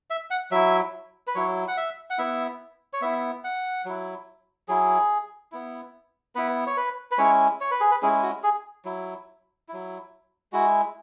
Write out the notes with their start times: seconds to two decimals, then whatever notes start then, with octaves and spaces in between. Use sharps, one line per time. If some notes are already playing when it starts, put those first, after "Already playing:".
0.10 E5
0.31 F#5
0.51 F#3 E4 E5
1.27 B4
1.35 F#3 E4 C#5
1.68 F#5
1.77 E5
2.10 F#5
2.18 B3 E4 E5
2.93 C#5
3.02 B3 E4 E5
3.44 F#5
3.85 F#3 E4
4.68 F#3 E4 G#4
5.52 B3 E4
6.35 B3 E4 B4
6.67 C#5
6.77 B4
7.11 B4
7.18 G#3 C#4 E4 C#5
7.61 C#5
7.71 B4
7.81 G#4
7.91 B4
8.02 G#3 C#4 E4 G#4
8.23 F#4
8.43 G#4
8.85 F#3 E4
9.69 F#3 E4
10.52 G#3 E4 F#4